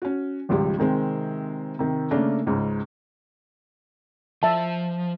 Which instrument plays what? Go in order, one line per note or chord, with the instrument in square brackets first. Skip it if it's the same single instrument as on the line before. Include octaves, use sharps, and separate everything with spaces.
[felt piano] C#4 F#4
G#1 C#2 F3 G3
C3 D#3 G#3 C4
C3 D#3
C#3 A3 A#3 C#4 D4 A#4
C#2 G#2 C#3
[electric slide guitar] F3 [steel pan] E5 A5